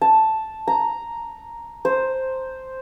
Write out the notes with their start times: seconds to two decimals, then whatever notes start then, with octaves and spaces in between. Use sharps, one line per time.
0.01 A5
0.68 A#5
1.85 C5